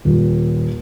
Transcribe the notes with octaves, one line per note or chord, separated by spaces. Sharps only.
D#1